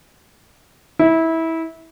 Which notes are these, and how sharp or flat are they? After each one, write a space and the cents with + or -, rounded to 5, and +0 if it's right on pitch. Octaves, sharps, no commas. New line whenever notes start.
E4 -20